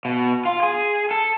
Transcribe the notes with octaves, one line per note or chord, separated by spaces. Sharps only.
B2
F4
G#4
A4